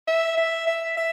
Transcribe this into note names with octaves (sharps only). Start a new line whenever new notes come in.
E5
E5
E5
E5